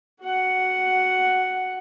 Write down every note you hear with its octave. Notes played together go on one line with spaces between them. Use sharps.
F#4 F#5